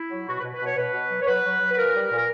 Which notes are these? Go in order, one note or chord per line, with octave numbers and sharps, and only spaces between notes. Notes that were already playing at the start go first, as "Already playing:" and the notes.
Already playing: E4
F#3
B2 F#4
B4
B2
B4
B2 C#5
B2 B4
B2
F#3
C#5
F#3 B4
F#3
F#3
B4
A#2 A#4
G3
A#2 A#4